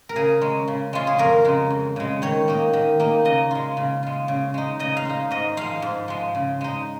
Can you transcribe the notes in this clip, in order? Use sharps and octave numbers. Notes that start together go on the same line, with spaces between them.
A#4
C#3 G#4
G#3 C#4
C#3
G#3 C#4 F4
G#4
F2 A#4
C#3 G#3
F2
C#3 G#3
D#3 C#5
A#3 D#4
D#3
A#3 D#4
C#3 D#5
G#3 F4
C#3
G#3 F4
C#3
G#3 D#4
C#3 D#5
F5
G#3 D#4
G#2 D#5
F3 G#3 F5
G#2
F3 G#3
C#3
G#3 D#4